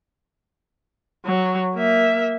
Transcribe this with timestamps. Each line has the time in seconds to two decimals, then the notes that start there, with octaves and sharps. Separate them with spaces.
1.26 F#3
1.75 A#3 E5